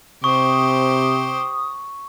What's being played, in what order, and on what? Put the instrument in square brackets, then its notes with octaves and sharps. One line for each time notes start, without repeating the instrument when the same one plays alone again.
[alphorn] C3 [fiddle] G4 C5 [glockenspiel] C#6 [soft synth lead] D#6